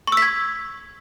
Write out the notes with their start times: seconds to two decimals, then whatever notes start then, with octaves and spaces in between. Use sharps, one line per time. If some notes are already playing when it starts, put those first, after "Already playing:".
0.07 C#6
0.12 E6
0.17 B6
0.22 G#6